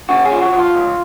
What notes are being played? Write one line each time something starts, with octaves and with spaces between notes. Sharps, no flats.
C#3 F#4
G#4
F3
F#4
F3
F4
C#2